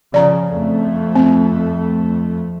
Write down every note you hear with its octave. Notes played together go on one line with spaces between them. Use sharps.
C#3 F3 D5 A#5
F2 A3
C4